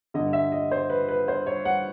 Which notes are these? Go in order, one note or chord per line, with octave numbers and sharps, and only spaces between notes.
D3 D#5
G2
E5
D#5
C5
B4
B4
C5
C#5
F#5